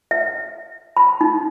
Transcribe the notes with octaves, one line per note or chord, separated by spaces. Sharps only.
E5
B5
D#4